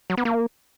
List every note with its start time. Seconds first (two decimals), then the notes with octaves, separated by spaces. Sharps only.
0.10 F#3
0.17 B3
0.25 A#3